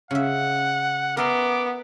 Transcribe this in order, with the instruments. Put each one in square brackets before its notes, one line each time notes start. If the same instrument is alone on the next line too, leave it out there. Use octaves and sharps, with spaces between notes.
[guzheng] C#3 E5 [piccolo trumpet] F#5
[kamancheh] B3 [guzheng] A#4 E5 C6 [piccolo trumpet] D6